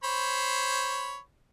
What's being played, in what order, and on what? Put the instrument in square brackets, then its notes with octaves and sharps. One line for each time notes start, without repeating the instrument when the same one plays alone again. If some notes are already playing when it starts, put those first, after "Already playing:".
[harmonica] C5 C#5 B5